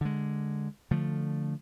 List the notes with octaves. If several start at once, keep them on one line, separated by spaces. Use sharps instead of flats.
D3 G#3
D3 F3 A3